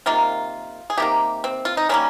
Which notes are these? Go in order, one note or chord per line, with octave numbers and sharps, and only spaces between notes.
C3 D#3 A#3 F4
G#4
C3 D#3 A#3 G4
C4
F4
D#4
D#3 G3 A#3 C#4